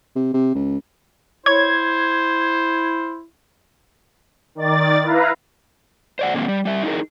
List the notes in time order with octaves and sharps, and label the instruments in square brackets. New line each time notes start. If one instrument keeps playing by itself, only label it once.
[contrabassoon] C3
C3
C#2
[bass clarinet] E4 [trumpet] C5 [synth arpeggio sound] C#5 [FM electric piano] G#6
[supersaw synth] D#3 D5 A6
E4 B4 F5 A#5
[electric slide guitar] C5 D5 F#5
A#2 D3 D#3 A#3 C4
G3
G3 E5
D#4 E4 G#4 A#4